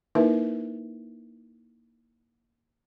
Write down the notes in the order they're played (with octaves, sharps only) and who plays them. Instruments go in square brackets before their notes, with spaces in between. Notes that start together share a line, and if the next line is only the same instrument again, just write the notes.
[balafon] A#3 D#4 E4 A#4 B4 E5